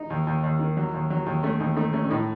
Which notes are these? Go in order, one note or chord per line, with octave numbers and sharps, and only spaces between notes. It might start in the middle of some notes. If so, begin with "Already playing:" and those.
Already playing: D#4
D#2
D#2
D#2
D#3
F#3
D#2
F#3
D#2
A3 C#4
D#2 D#4
A3 D#4
A3 C#4
C#4
A2 D#4